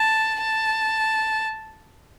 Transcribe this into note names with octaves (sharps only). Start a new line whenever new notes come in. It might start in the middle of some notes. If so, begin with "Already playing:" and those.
Already playing: A5
A5